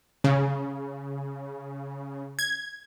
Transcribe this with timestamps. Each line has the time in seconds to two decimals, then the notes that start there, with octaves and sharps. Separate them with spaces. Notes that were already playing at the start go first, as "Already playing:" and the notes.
0.24 C#3
2.39 G#6